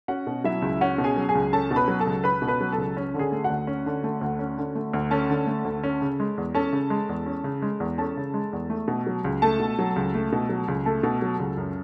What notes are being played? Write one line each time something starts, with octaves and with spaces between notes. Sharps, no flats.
C#4 F#4 F#5
B2
F#3 E4 E5
C#2
C#4 F#4 F#5
B2
G#4 G#5
F#3
G#4 G#5
C#2
C#4 A4 A5
B2
B4 B5
F#3
A4 A5
C#2
C#4 B4 B5
B2
B4 B5
F#3
A4 A5
C#2
C#4
D3
G#4 G#5
A3
F#4 F#5
D2
C#4
D3
A3
D2
C#4
D3
A3
D2
C#4 A4 A5
D3
A3
D2
C#4
C#3
G#3
E2
C#4 A4 A5
C#3
G#3
E2
C#4
C#3
G#3
E2
C#4 A4 A5
C#3
G#3
E2
A3
B2
F#3
C#2
A3 A4 A5
B2
F#3
C#2
A3
B2
F#3
C#2
A3 A4 A5
B2
F#3
C#2
F#2